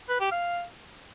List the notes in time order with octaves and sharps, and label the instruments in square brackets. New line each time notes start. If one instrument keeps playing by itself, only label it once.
[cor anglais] B4
G4
F5